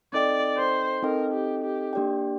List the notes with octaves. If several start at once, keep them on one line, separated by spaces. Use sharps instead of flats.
C4 D#4 A4 D5 D#5 G5
C5
C4 D#4 A4 A#4 D#5 G5
G4
G4
A#3 D4 G4 D5 G5